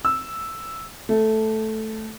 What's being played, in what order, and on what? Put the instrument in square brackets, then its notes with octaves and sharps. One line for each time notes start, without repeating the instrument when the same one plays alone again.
[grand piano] E6
A3